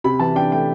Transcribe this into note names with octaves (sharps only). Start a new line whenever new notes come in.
C3 B5
E3 A5
D4 G5
A3 G5